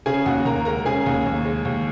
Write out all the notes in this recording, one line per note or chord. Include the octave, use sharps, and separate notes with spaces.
C#3 G#4 G#5
D#2 F#4 F#5
D#2 A#4 A#5
G#3 A#4 A#5
C#3 G#4 G#5
D#2
D#2
G#3
D#2